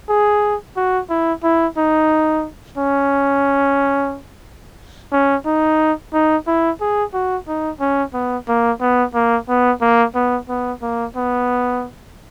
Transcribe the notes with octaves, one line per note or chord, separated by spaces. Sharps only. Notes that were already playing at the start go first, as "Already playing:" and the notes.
G#4
F#4
E4
E4
D#4
C#4
C#4
D#4
D#4
E4
G#4
F#4
D#4
C#4
B3
A#3
B3
A#3
B3
A#3
B3
B3
A#3
B3